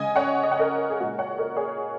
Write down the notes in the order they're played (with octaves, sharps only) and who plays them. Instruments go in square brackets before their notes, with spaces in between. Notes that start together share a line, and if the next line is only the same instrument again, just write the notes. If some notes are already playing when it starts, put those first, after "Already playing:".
Already playing: [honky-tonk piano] C#3 G#3 D#5 G#5
C#5 F#5
D#5
F#5
A#4 D#5
G#4
A#2 G#3 F#4
C#5 F#5
A#4 D#5
G#4 C#5